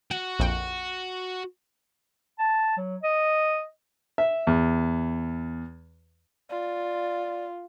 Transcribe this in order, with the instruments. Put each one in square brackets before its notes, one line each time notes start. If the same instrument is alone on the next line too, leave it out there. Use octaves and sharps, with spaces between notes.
[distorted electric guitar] F#4 [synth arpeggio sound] F#5
[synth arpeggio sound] A#1 F2 G5
[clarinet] A5
F#3
D#5
[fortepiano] E5
E2
[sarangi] F4 [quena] D5